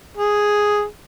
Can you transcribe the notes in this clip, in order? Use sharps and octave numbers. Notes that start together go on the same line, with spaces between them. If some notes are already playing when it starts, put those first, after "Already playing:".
G#4